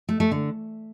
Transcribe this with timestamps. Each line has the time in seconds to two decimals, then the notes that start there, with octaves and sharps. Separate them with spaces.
0.09 A3
0.20 A3
0.31 D3